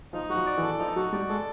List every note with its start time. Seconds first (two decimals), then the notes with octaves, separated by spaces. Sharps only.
0.13 F3 D#4
0.30 F#3 F#4
0.35 F3
0.46 D5
0.58 E3
0.63 A4
0.68 E3
0.79 F3 D#4
0.96 F#3 F#4
1.13 G3 D5
1.29 G#3 A4